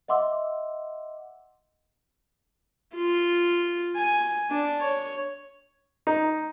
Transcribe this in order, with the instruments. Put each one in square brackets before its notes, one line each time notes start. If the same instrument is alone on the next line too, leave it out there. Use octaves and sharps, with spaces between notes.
[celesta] D#5 E5 F#5 C6 D6 E6
[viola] F4
G#5
D4
C#5
[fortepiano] D#4